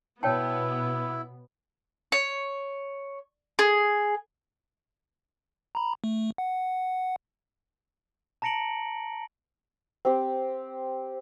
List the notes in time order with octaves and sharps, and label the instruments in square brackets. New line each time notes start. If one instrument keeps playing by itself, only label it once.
[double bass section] B2 [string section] B3 [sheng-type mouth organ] E4 [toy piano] C#5 G5 A5
[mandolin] C#5
G#4
[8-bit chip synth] A#5 B5
A3
F#5
[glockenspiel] A5 A#5 A#6 C#7 D7 F#7
[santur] C4 G4